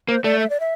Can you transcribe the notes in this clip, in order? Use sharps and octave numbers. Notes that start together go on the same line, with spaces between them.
A#3 C5
A3 D5
E5
D5
E5